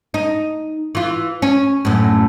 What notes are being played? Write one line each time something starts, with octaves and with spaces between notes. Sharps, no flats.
D#4
E3 F4
C#4
F#2 A2